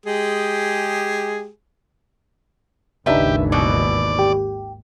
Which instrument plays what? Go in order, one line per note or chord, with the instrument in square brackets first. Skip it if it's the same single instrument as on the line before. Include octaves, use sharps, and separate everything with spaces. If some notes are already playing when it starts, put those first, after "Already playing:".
[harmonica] G#3 G4 G#4
[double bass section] G#1 D#2 [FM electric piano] C#3 D4 D#4 [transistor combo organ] G4 [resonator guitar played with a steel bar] B4 E5
[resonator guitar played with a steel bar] B2 E3 [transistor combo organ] D5
[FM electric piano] G4